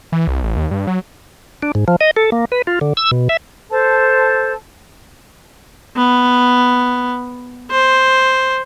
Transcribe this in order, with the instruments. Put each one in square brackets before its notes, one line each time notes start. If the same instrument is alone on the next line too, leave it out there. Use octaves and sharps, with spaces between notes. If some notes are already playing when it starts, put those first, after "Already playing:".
[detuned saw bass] E3
C2
A1
D#2
G2
F#3
[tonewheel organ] D4
G#2
F3
D#5
A4
A#3
B4
F4
D3
E6
B2
E5
[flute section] A4 C5 A5
[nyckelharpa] B3
C5